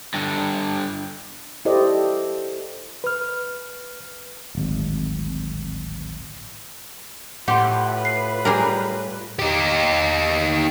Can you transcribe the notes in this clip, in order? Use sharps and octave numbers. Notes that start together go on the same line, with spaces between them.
G2 D3
E4 G4 A4 C5 D5 D#5
B4 F6
D1 G#1
A2 F4 G4 B4 F#5 C6
C7
G3 G#4 A#4
D#4 G4